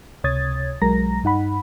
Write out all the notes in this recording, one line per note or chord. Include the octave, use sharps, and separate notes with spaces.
C#2 C3 C#5 D#6 G#6 A6
B1 F#3 G#3 A#4 A#5 A#6
G2 D#4 F#5 B5